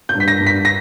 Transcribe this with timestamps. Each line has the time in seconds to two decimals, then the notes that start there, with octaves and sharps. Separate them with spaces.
0.09 G6
0.15 G2
0.20 B6
0.28 A#6
0.41 G2
0.47 B6
0.65 A#6